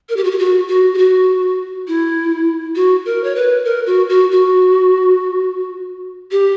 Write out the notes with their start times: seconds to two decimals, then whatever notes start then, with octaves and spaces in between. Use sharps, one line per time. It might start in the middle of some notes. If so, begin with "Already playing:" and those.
0.09 A#4
0.16 G4
0.24 F#4
0.31 G4
0.39 F#4
0.68 F#4
0.94 G4
0.98 F#4
1.87 E4
2.76 F#4
3.06 A#4
3.24 C#5
3.36 B4
3.65 A#4
3.86 F#4
4.09 F#4
4.32 F#4
6.31 G4